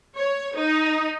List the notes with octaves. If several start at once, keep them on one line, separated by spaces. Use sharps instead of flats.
C#5
D#4